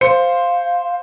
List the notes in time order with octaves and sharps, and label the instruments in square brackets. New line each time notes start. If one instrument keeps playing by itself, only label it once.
[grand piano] C5 C#7 [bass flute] F5